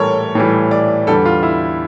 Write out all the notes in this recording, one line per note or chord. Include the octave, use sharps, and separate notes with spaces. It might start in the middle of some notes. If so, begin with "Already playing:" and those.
Already playing: A2 E3 G3 A4 A#4 C#5
A2 E3 G3
D5
E2 D3 G3 A4
F4
E4